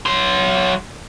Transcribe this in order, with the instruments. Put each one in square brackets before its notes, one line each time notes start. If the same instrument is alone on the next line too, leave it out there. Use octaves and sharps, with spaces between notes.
[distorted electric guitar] F#3 C6